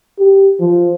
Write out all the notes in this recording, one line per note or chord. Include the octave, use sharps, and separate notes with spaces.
G4
F3